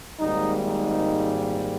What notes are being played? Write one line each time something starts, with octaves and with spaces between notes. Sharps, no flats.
G#1 G#2 G3 A#3 D#4
D#4